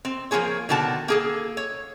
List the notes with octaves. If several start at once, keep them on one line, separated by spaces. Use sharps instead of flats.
C4
F3 F#3 A#3 G#4 C#5
B2 D3 D#3 F#4 A5
A#3 G#4 A4
C#5